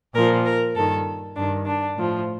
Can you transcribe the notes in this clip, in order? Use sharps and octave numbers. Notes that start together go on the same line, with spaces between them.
A#2 F3 A#4
A#4
G2 D#3 A4
G2 D#3 D4
D4
A2 F3